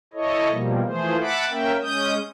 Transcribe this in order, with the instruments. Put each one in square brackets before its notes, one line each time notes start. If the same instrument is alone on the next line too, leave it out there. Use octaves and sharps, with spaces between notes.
[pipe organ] E4 A4 C#5 D#5
B2 F3 G3 A#3
E3 F3 A3 G#4 C5
E5 F#5 A5 B5 D6
A#3 C#4 A#4 E5 G5
G#3 C#4 D#6 G6